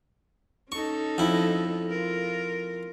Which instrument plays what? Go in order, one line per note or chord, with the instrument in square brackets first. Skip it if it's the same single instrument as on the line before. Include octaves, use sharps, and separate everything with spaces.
[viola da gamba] C#4 D#4 A4 [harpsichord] C#6
[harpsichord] F2 E4
[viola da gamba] F4 A#4